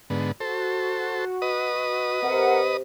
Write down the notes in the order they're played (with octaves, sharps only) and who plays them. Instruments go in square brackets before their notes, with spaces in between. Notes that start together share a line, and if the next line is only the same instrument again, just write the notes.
[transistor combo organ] G#2 D3 B3
[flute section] F#4 [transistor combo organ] A4 C5
[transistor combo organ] B4 D#5 D#6
[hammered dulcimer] C3 [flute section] A#4 F#5